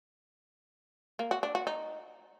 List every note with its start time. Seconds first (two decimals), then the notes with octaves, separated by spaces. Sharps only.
1.19 A#3
1.31 F#4
1.43 D4
1.55 F#4
1.67 D#4